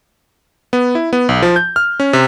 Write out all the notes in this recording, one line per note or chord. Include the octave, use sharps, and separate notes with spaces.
B3
E4
B3
B1
F3
G6
F6
C#4
C3